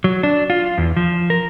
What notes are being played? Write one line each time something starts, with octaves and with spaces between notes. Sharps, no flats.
F#3
D4
F4
E2
F3
A#4